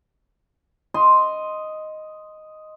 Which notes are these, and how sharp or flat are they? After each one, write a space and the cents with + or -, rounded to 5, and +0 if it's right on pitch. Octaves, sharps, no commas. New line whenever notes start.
D#5 +0 C6 +0